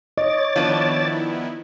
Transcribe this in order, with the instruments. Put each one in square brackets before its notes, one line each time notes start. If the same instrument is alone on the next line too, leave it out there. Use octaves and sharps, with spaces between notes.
[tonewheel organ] C#5 D6 A6 [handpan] D#5
[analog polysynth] D#3 B3 E4 [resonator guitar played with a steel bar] F3 D4